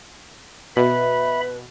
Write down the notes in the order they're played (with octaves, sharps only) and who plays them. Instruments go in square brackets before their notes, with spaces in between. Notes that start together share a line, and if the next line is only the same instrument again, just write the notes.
[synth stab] B2 [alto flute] B4 [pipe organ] E5 B5